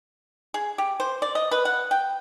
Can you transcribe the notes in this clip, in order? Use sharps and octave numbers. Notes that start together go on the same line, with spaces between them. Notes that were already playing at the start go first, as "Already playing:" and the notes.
G#4
G4
C5
D5
D#5
B4
F#5
G5